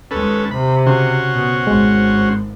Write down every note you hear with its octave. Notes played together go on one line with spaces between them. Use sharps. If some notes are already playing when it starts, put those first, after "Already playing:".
D#2 G#3 C#4 A4 B4
C3 B5
C#3 C#4 F#4 C5
B2
G#1 G#3